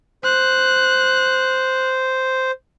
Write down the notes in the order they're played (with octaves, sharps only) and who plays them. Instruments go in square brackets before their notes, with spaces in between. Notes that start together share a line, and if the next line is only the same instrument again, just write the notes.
[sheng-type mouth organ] C5 [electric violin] F#6